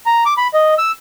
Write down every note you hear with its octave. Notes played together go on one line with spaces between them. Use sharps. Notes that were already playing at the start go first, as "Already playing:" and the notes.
A#5
D6
B5
D#5
E6